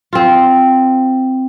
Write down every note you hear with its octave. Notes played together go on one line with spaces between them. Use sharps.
C4 F4